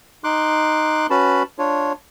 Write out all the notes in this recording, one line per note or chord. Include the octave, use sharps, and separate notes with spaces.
D#4 C6 D6 F#6
C#4 F#4 B4 A5 B5
D4 F4 C#5